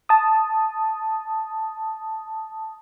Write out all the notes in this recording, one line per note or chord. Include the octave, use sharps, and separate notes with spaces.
A5 D#6